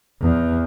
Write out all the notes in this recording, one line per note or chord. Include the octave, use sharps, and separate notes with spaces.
E2